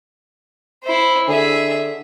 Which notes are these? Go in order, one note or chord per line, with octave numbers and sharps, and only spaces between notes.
E4 C5
D3 G#4 E5